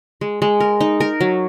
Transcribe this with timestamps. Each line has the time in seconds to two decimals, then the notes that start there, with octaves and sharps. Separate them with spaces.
0.21 G#3
0.42 G#3
0.60 A#4
0.81 D#4
1.00 A#4
1.21 F#3